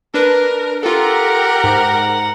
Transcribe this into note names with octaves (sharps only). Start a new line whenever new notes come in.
D4 A#4 B4
F4 G4 A4 A#4 F#5 A#5
G#2